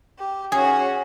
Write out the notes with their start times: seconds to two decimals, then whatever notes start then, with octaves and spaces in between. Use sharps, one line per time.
0.18 G4
0.52 C#4 F#4 G#4